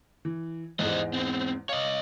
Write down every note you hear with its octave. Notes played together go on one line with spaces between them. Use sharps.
E3
E2 G#2 G#3 B4 C5 D#5
B3 C4
C#5 D#5 F5